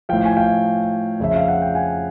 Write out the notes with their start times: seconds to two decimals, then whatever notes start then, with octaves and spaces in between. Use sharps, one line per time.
0.09 A2 F3 F5 G5
0.25 G#5
0.37 F5 G5
1.20 F2 C#3 F3 E5
1.36 F5
1.48 F#5
1.62 G5
1.75 F#5 G#5